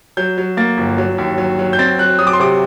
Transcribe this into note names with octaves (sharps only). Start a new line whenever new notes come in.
F#3 G6
F#3
A#3 A6
G1
F#3
D#2
F#3
F#3
G6
C4 A6
F#3 F#6
F#3 D#6
D6
C6
C3 D6